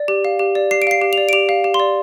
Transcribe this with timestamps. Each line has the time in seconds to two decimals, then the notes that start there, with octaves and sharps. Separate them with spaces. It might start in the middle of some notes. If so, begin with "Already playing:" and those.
Already playing: D5
0.08 G4
0.25 F5
0.39 G4
0.55 D5
0.71 G4 C7
0.82 D7
0.87 F5 C7
1.02 G4
1.13 D5 F7
1.29 D7
1.33 G4 F7
1.49 F5
1.64 G4
1.74 C6
1.79 D5